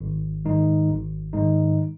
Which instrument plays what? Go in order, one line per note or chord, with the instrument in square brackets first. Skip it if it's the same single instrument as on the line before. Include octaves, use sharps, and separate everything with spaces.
[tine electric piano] G#1
G#2 D#3 G#3 D#4
G#1
G#2 D#3 G#3 D#4